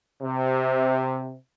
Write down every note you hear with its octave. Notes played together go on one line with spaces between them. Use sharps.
C3